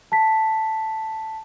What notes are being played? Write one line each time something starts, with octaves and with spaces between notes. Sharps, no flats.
A5 B6